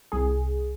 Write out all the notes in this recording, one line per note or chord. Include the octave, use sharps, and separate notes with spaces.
C2 G#4